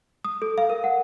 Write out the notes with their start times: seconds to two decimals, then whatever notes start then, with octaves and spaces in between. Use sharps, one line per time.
0.25 D#6
0.42 A4
0.58 F5
0.70 A#4
0.84 F#5